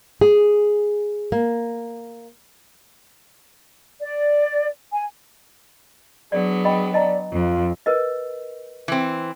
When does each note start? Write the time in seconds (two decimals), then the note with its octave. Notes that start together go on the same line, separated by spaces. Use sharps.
0.21 G#4
1.32 A#3
4.01 D5
4.91 G#5
6.32 F#3 B3 D4 G#4 D5
6.65 D#5 G5 B5
6.94 D5 D#5 A5 A#5
7.31 F2 F4
7.86 A#4 B4 D#5
8.88 E3 C4